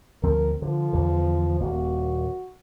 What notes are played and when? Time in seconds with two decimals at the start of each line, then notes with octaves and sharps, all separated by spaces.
0.23 D2 F3 C4 A#4
0.62 D3 F3
0.93 E2 D3
1.60 D#1 A#3 F#4